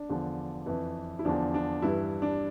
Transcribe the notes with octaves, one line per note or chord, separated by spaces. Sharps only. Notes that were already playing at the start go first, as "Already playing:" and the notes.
Already playing: D4
E2 D3 F3
F2 E3
E4
E2 D3 F3 D4
D4
G2 E3 E4
D4